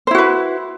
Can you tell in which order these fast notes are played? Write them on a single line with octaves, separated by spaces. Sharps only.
C5 E4 F#4 B4